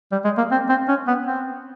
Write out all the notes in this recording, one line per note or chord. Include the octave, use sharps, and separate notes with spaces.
G3
G#3
A#3
C4
C4
C#4
B3
C4